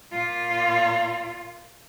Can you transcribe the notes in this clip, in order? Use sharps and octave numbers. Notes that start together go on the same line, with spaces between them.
A#2 F4